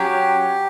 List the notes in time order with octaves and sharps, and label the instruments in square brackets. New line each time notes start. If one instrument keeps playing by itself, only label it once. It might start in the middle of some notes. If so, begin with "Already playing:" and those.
Already playing: [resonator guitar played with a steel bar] F#3 C#4 [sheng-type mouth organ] G4